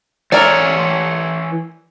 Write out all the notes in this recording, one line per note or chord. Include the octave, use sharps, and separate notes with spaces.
E3 A#4 C#5 D5 E5